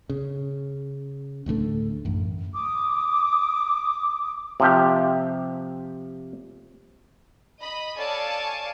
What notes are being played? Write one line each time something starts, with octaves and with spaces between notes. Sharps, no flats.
C#3
D1 A2 D3 A3
A1 F#2
D6 D#6
C3 F3 G4
D#5 B5
A4 C#5 D5 F5 G#5 A5